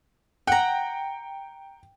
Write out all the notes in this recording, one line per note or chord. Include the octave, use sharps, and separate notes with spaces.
F#5 G5 A#5